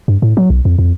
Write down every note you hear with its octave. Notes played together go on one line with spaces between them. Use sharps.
G2
A2
F#3
B1
F2
F2